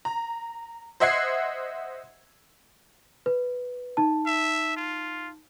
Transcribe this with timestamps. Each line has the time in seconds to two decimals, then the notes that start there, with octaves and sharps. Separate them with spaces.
0.05 A#5
1.00 C5 D#5 E5 F#5 G#6 C7
3.26 B4
3.97 D#4 A5
4.27 E5
4.77 F4